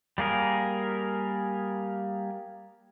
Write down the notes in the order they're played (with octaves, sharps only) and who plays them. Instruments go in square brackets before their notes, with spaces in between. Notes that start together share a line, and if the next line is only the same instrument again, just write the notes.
[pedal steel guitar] G3 A#3 G#4 A#4